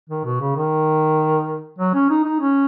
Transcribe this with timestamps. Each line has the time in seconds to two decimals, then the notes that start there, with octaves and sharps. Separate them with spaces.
0.09 D#3
0.25 B2
0.40 C#3
0.56 D#3
1.78 F#3
1.94 C#4
2.10 D#4
2.24 D#4
2.40 C#4